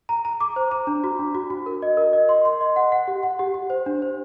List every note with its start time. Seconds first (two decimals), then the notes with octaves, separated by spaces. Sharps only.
0.09 A#5
0.25 A#5
0.41 D6
0.56 C5
0.71 A#5
0.87 D4
1.04 F#4
1.19 D4
1.35 F#4
1.50 F#4
1.66 A#4
1.82 D#5
1.97 A#4
2.13 D#5
2.29 C6
2.45 C6
2.61 D#5
2.76 F#5
2.92 F#5
3.08 G4
3.23 F#5
3.39 G4
3.54 G4
3.70 C5
3.86 D4
4.02 C5